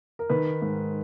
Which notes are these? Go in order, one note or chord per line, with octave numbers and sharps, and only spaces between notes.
A#4
D#3 B4
G#2